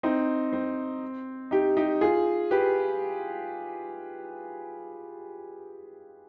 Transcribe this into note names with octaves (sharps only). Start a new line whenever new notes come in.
C4 D#4
C4
D#4 G4
D#4 G4
F4 G#4
G4 B4